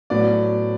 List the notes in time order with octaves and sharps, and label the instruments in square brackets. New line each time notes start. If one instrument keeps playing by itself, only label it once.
[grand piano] A2 F#3 B3 D5